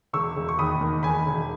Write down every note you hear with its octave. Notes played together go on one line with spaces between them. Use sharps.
E1 C#6 E6
E1
C#6
D#2 B5 D#6
D#3
E1 G#5 B5
E1